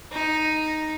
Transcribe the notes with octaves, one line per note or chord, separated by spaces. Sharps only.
D#4